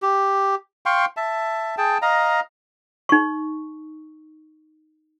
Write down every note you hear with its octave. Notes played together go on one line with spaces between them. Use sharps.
G4
F5 G5 C6 C#6
E5 A5
G#4 G5 A5
D#5 F5 A#5
D#4 C#6